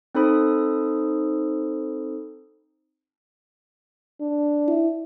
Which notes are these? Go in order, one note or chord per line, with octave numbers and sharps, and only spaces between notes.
C4 D#4 A4 C5 B5 D#6
D4
E4